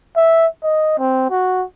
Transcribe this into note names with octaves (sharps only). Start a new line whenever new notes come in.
E5
D#5
C4
F#4